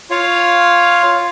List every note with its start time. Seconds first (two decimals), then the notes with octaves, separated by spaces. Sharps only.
0.11 F4 C#5 F5